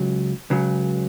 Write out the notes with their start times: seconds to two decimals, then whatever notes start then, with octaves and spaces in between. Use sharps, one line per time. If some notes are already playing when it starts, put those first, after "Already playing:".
Already playing: C#2 C#3 F#3
0.50 C#2 C#3 F#3